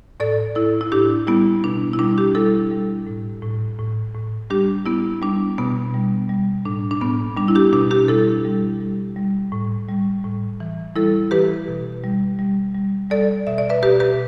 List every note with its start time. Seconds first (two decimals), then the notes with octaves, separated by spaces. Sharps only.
0.20 A2 A4 D5
0.56 A2 E4 A4
0.81 E4
0.92 A2 D4 G4
1.27 G3 B3 E4
1.64 B2 D4
1.93 E4
1.99 G3 D4
2.17 D4 G4
2.35 G3 E4 A4
2.72 G3
3.07 A2
3.42 A2
3.79 A2
4.14 A2
4.50 G3 D4 G4
4.86 G3 B3 E4
5.22 G3 D4
5.58 B2 B3
5.94 G3
6.29 G3
6.65 A2 D4
6.91 D4
7.01 A2 B3
7.37 G3 D4
7.48 E4
7.55 D4 G4
7.73 B2 D4 G4
7.91 D4 G4
8.08 G3 E4 A4
8.45 G3
8.81 G3
9.16 G3
9.52 A2
9.88 G3
10.24 A2
10.60 E3
10.96 G3 E4 A4
11.31 E3 G4 B4
11.68 B2
12.04 G3
12.39 G3
12.74 G3
13.10 G3 A4 D5
13.47 B2 E5
13.58 D5
13.70 B4 E5
13.83 B2 G4 B4
14.00 G4 B4